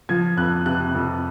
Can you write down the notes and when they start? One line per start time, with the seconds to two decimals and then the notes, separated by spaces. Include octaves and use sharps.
0.09 F3 G#6
0.37 F2 F#6
0.66 C3 F#6
0.95 F2